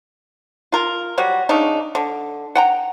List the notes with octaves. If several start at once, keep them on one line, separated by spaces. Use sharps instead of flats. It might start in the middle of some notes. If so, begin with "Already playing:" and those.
F4 A#4
F#3 G3 F#4
C#3 D4 D#4
D3
F#5 G5 A#5